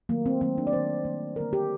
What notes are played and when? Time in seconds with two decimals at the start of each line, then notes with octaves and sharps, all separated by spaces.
0.09 D#3 F#3 A3 A#3
0.26 C4
0.41 D#3 F#3 A3 C4
0.58 D4
0.67 D5
0.73 D#3 G3 A#3 C5
1.05 D#3 G3 A#3
1.36 D3 G3 A#3 A#4
1.53 G4